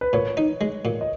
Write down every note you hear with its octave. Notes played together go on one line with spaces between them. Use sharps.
B4
A#2 C#5
D#4
G#3
A#2
D#5